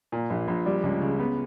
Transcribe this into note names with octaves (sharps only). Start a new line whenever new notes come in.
A#2
A#1
A#1
G3
C#2
C#3
B3